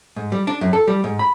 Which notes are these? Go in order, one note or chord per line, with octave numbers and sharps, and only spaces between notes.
G#2
G3
D4
F#2
A4
G3
G#2
B5